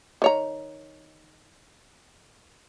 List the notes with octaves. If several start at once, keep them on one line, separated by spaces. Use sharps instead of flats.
D#3 C#5 A#5